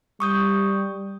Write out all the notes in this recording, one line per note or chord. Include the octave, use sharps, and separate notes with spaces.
G3 C#6 D#6 G6